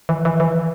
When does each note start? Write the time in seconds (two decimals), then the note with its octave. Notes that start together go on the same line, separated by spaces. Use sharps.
0.09 E3
0.25 E3
0.40 E3